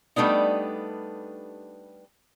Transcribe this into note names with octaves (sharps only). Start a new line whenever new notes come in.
G3 A3 B3 D4 D#4